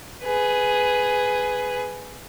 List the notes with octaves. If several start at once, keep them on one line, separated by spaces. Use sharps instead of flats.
G#4 B4